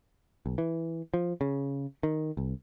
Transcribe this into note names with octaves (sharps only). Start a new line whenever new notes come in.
B1
E3
F3
C#3
D#3
C2